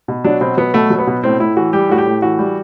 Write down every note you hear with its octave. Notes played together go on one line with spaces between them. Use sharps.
B2
F#3 D4
B2 C4
F#3 B3
B2 A3
F#3
B3
B2
A2 C4
A2 E4
E3 F#4
G3 G4
A2 F#4
G4
A2
E3 F#4
G3